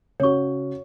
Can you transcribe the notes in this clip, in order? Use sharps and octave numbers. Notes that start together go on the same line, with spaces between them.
C#3 F#4 C#5 C#6